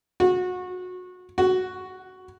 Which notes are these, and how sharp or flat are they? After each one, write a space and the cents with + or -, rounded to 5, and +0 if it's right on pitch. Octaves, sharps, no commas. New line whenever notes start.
F#4 -25
F#4 +0